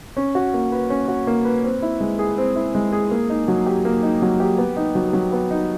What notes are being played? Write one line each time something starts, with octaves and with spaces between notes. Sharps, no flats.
C#4
F#4
A#3
B4
C#4
F#4
A#3
B4
C4
E4
G#3
G#4
C4
E4
G#3
G#4
A#3
D#4
F#3
G4
A#3
D#4
F#3
G4
B3
D#4
F#3
F#3
B3
D#4